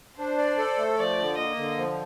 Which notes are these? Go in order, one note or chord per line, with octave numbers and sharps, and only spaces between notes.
D4 C5
D5
A4
A3
F3 D5
D3
A#3 D#5
D3
F3